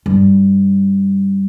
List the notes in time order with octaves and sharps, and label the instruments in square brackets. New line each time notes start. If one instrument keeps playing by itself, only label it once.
[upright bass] G2